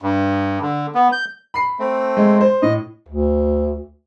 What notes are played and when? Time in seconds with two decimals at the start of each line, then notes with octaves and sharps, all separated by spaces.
0.02 G2
0.62 D3
0.95 B3
1.12 G6
1.54 B5 C7
1.79 A3 C4
2.17 G#3
2.41 C5
2.62 A2 D#5
3.08 D2